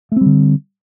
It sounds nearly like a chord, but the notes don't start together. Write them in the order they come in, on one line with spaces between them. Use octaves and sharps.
A3 C4 G3 D3